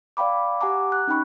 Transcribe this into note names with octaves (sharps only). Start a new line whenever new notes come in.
D5 F5 G5 B5 D6
G4 F#5 G#5 A#5 D6
F#6
C#4 D#4 G5 B5 C#6